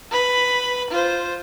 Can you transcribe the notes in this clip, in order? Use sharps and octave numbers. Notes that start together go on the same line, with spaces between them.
B4 B5
F4 C5